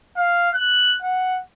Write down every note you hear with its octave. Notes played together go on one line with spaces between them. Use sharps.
F5
F#6
F#5